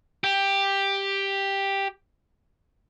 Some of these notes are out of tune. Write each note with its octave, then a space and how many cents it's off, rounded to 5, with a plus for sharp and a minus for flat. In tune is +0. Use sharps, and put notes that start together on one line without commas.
G4 +5